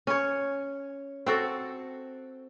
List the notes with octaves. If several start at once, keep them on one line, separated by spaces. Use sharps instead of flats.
C#4 C#5
C4 F#4 A4